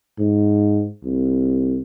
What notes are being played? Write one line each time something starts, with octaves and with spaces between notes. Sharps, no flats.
G#2
C2